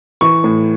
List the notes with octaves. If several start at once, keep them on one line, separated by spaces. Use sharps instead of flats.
E3 C#6
A2